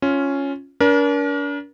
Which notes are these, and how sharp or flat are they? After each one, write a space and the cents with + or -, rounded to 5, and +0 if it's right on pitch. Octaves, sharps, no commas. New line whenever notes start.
C#4 +0 F4 +0
D4 -40 A#4 +35